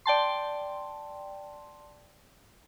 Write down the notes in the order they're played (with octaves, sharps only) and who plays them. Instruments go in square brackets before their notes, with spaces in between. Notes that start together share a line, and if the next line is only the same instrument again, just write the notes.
[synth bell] D5 G5 A5 C6